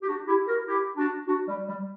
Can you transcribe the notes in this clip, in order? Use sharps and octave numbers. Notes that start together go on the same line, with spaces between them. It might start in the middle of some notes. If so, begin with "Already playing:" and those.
G4
D4 F#4
E4 G4
F#4 A#4
E4 G4
D4 F#4
D4 F#4
G3
G3